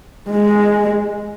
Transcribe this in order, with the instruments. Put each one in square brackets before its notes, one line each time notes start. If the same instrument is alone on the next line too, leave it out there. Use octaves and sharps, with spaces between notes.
[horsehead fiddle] G#3